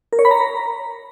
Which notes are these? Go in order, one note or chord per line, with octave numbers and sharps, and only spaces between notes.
A#4
C#5
B5
A#5